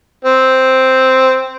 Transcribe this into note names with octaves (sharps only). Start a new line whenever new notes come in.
C4